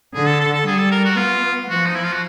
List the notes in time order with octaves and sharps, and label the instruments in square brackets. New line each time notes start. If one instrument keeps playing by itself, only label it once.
[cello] D3 [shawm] G#4
[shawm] A4
A4
A4
[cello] G3 [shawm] G#4
[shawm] A4
A#4
F#4
[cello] B3 [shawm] F4
[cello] F3 [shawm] F#4
[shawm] D#4
E4
F4
F#4